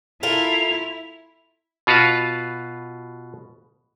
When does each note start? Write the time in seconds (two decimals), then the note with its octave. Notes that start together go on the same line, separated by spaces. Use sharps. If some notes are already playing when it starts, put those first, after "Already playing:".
0.23 E4 F4 A4 A#4 F7
1.87 B2 F4 F#4 B4 F5